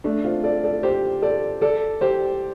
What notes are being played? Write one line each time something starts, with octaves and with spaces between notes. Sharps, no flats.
A3 D4
C4 F4
A4 D5
A4 D5
G4 C5
A4 D5
A4 D5
G4 C5